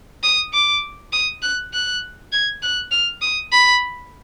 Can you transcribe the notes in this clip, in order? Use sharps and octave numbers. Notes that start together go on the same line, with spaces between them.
D#6
D6
D#6
F#6
F#6
G#6
F#6
F6
D#6
B5